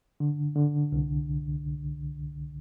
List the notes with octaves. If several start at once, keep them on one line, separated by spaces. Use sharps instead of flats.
D3
D3
C2